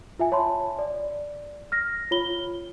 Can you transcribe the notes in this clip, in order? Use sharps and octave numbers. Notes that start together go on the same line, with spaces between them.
F4 E5 G#5
C#5 A5 B5 C6
D5
F6 A#6
F4 C#5 B5 G7